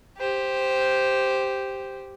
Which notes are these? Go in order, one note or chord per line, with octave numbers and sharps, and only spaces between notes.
G4 C5